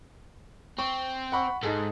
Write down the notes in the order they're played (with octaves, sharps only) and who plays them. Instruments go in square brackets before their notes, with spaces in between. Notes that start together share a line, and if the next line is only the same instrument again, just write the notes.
[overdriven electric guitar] C4 [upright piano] C#6
[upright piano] F#5 B5 C#6
[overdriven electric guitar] G#2 [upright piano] D#4 G#4 A4